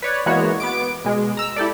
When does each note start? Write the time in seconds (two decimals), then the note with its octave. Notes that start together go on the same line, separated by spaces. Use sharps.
0.02 B4 C#5 D5
0.26 E3 G#3 A#3 B3 F#4 C#5
0.60 B3 D6 D7
1.05 B2 G#3
1.37 A#5 E6
1.56 E4 G4 A4 D5